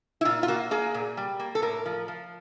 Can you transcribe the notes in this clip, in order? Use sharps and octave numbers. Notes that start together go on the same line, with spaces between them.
E4
A#2 F4
F4
A#3 F#4
A#3 G#4
A#2
G3
A#3
A4
A2 A#4
F3
F3